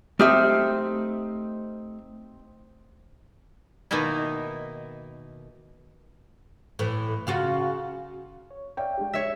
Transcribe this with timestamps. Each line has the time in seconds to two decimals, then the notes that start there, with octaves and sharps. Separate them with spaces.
0.19 A3 C4 D#4 G4 E5 F6
3.91 B2 D#3 A#3 D#4 E4
6.79 A2 E3
7.27 C#3 F4 F#4
8.51 C#5
8.77 C#5 D5 E5 F5 G5
8.98 G#3 D4 G4
9.13 C#5 E5